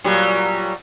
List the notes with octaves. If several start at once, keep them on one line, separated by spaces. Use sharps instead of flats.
A#2 F#3 G3